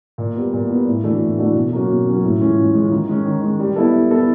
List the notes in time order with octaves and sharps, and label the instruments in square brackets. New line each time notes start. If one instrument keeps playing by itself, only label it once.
[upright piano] A#2
G3 B3
A#2
G3 B3
A2
E3 A3 D4 F#4
A2
E3 A3 D4 F#4
B2
F#3 A#3 C#4 F#4
B2
F#3 A#3 C#4 F#4
A2
E3 G#3 C#4 F4
A2
E3 G#3 C#4 F4
D#3
G#3 C#4
D#3
G#3 C#4
G3
B3 E4 A4
G3
B3 E4 A4